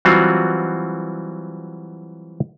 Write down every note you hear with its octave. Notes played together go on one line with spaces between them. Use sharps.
E3 F#3 G3 C4 F4 F#4